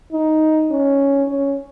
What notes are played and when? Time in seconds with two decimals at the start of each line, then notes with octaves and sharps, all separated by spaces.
0.12 D#4
0.71 C#4
1.28 C#4